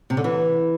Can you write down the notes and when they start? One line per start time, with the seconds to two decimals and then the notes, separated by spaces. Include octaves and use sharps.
0.10 C3
0.17 D3
0.24 E3